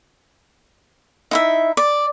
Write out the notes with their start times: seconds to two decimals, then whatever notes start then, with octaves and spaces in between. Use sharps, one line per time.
1.31 D#4 E4 E5
1.77 D5